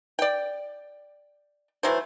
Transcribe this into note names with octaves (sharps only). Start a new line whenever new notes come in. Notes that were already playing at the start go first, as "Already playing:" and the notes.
D5 G5
E3 F#3 A3 C5